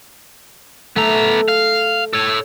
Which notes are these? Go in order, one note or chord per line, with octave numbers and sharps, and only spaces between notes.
A3 B3 A#5
F5
A4 C#5